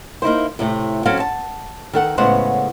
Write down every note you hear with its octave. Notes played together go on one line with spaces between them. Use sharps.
A#3 D#4 E4 C5
A2 C3 A3
F#3 C4 C#4 A4 F5
A5
D#3 A4 F#5
A2 C#3 G#3 B3 C5 F#5